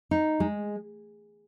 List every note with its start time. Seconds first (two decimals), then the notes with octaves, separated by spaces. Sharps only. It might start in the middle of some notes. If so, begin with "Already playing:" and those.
0.11 D#4
0.40 G#3